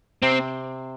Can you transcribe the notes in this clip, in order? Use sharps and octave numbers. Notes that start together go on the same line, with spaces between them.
C3 C4